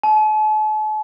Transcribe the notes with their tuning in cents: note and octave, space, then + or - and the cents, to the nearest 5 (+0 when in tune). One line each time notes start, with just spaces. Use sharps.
A5 -45